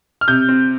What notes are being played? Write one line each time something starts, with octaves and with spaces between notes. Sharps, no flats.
F6
C3 G6
C4